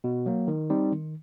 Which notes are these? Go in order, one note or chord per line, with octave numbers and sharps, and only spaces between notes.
B2
F#3 A#3
D#3
G3 C4 D#4
D#3